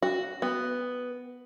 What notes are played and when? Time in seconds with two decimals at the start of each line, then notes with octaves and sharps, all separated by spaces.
0.02 F#4
0.42 B3